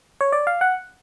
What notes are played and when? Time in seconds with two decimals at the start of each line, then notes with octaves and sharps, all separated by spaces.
0.21 C#5
0.32 D5
0.47 F5
0.61 F#5